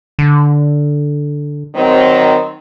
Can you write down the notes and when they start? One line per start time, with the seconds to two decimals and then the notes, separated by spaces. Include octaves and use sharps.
0.19 D3
1.75 D#3 F#3 C4